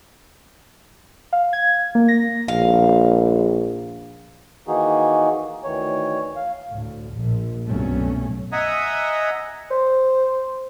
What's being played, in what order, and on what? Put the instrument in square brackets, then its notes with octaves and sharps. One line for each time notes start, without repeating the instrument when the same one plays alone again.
[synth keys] F5
G#6
A#3
A#6
[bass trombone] A#1 [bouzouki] F5
[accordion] D#3 E3 A#3 D#4 F#4 G#4
D2 D#3 E3 C#5
F5
[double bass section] D2 A2
A#1 A#2
C2 G2 B2 F#3 A3 C#4
[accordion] D#5 E5 F#5 G#5 A#5 D#6
[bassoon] C5